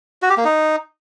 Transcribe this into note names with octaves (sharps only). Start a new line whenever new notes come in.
F#4
G4
A#3
D#4